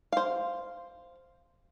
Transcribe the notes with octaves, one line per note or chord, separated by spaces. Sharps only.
C5 F5